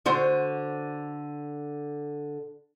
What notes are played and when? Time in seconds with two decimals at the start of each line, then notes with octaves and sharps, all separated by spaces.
0.06 D3 F#4 C5